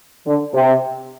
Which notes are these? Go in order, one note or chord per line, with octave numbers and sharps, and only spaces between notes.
D3
C3